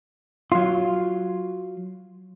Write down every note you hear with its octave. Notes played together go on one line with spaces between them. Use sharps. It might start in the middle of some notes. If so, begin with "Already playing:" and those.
F#3 F4